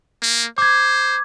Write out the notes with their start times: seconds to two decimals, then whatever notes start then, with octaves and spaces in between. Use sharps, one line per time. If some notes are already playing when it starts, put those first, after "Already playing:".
0.22 A#3
0.58 C5 D6 G#6